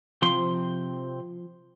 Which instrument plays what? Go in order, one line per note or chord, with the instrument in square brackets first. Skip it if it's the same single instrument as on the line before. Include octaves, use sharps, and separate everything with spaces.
[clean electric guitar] C3 C4 C6 [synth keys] F3